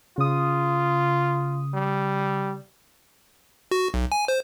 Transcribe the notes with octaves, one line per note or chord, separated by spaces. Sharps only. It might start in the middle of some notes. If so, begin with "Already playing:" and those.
C#3 F4 D#6
G3
F#4
B1
G#5
C5